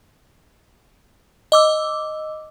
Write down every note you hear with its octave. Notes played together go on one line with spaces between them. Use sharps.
D#5 D6 E6